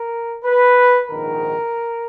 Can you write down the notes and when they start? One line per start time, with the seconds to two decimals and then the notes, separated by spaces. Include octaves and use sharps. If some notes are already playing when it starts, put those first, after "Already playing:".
Already playing: A#4
0.44 B4
1.09 A#1 G#2 D#3 A#4